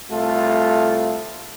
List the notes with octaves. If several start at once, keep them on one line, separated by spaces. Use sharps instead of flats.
C2 A3 F4 A4